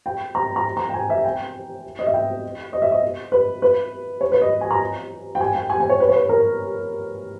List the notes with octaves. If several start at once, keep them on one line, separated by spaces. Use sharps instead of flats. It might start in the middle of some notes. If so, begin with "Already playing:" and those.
G5
A#5
A#5
A#5
G5
G#5
E5
G5
D#5
E5
G5
D#5
E5
D#5
B4
B4
C#5
B4
D#5
G#5
A#5
G5
G#5
G5
G#5
G#5
C#5
B4
C#5
B4
A#4